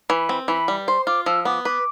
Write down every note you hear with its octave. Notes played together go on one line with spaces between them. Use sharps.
E3 B5
C4
E3 B5
G3
C5 C6
F4 D6
F3 E6
B3 D6
B4 D6